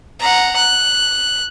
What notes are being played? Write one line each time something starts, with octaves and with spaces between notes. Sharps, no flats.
F#5 A#5
F#6